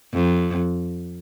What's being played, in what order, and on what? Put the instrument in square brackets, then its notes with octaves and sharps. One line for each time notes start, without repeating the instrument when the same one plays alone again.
[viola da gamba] F2